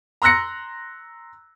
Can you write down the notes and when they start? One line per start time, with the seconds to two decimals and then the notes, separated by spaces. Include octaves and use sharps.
0.22 A#5 C6 E6 F#6 A#6 C#7